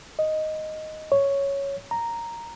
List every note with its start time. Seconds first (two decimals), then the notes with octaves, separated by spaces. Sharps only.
0.19 D#5
1.12 C#5
1.91 A#5